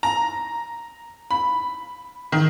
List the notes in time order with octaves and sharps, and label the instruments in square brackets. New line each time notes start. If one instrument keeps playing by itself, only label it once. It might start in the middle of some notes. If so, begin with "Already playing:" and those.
[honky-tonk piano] A#5
B5
D#3